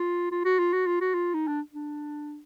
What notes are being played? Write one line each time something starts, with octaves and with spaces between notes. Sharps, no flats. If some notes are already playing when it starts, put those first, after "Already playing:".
Already playing: F4
F4
F#4
F4
F#4
F4
F#4
F4
D#4
D4
D4